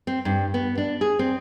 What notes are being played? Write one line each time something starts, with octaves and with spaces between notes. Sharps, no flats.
C4
G2
B3
D4
G#4
C4